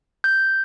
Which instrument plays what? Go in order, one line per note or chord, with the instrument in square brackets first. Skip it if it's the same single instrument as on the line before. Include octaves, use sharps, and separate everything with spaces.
[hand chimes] G6